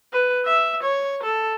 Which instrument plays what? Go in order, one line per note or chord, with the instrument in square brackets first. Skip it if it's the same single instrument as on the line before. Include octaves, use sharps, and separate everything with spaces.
[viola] B4
E5
C#5
A4